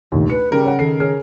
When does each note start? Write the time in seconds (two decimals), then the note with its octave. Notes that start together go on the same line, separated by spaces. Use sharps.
0.12 F1 A#1 D#2 D#3
0.30 B4 C#7
0.52 C#3 G3 A#4
0.64 C#5 F#5
0.79 D#3 A4 C7
1.00 G#4 C#5 F6